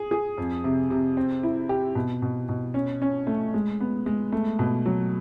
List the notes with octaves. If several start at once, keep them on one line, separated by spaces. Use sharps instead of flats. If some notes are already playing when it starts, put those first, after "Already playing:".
Already playing: G#4
G#4
F2
C3
C3
C4
E4
G4
B2
B2
B2
C#4
C#4
A3
G#3
B3
G#3
A3
B2
F#3